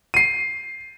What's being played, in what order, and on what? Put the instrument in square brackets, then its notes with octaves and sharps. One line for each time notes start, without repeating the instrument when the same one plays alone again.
[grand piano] C7 D#7